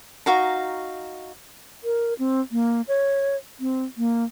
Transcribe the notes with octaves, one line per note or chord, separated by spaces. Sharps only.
D#4 F#4 F5 A#5
A#4
C4
A#3
C#5
C4
A#3